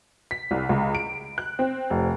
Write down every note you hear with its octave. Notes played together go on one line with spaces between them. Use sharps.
B6
C2
C#2
D7
F#6
C4
F1